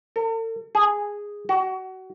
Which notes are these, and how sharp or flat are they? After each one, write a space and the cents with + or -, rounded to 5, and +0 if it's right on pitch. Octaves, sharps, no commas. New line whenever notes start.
A4 +45
G#4 -10
F#4 +25